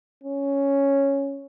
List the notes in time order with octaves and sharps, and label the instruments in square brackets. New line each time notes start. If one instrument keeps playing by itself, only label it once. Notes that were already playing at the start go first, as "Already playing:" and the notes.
[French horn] C#4